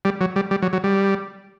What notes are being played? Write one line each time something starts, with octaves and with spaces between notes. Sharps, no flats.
G3
F#3
G3
G3
F#3
F#3
G3